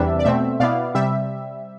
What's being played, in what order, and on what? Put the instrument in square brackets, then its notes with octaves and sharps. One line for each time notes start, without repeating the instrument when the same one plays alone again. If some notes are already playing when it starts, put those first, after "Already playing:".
Already playing: [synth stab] E2 C3 E3 G3 D4 E5
D5
B2 A3 C4 E5
B2 B3 E4 D5 F5
C3 G3 E5